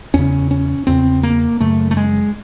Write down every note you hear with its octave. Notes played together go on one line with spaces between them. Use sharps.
E2 C#3 C#4
C#4
E2 C#3 C4
A#3
F#2 C#3 A3
A3
G#3